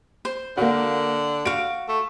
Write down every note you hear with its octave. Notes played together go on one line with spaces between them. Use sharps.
C5
D3 A#3 F#4
F#4 F5 D7
A3